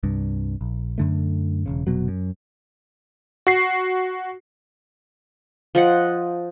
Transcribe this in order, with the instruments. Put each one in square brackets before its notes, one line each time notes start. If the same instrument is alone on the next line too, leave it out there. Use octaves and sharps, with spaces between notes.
[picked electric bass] C2 G2
A#1
F#2 D3 A3
E1 A#1 C#3
F1 B2 F#3
F#2
[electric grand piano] F#4 C7
[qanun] F3 D#5 F#5